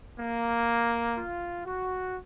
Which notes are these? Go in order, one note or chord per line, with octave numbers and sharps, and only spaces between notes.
A#3
F4
F#4